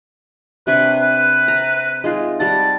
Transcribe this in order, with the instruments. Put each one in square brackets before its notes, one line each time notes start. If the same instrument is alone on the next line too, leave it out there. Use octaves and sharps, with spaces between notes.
[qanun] C3 D4 C#6 [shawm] B4
[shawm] B4
[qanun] A#5
G#3 D#4 F4
[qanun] G3 G4 F#5 [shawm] A5